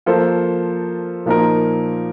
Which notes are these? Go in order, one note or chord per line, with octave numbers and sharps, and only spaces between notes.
F3 A#3 F4 A4 C5
A#2 F3 A#3 D#4 A#4